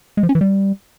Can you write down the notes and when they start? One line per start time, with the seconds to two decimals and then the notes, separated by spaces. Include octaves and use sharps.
0.17 G#3
0.23 F3
0.29 C#4
0.35 E3
0.41 G3